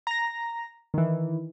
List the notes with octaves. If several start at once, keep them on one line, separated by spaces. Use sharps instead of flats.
A#5 A#6
D#3 E3